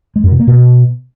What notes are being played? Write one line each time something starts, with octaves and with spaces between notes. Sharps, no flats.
G#3
F#2
C3
A#3
B2